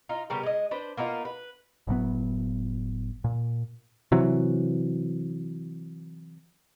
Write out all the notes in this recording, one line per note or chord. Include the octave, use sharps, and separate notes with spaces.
D#4 F4
C#3 G3 B3 A#4
G#3 D#5
D4 B4 C5
A#3 B3 D#4 F4
B4
F#1 A2 F#3 B3
A#2
C3 E3 F#3